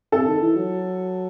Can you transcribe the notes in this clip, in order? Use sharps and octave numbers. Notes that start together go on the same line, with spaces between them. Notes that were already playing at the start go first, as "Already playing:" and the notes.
C3 A4
D#3
E3
F#3